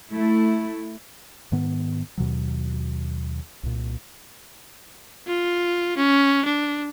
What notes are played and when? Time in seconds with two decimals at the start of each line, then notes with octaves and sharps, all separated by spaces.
0.12 A3 E4
1.52 G#2 D#3 B3
2.18 D#2 B2 D#3 F#3
3.63 C2 A#2
5.27 F4
5.97 C#4
6.45 D4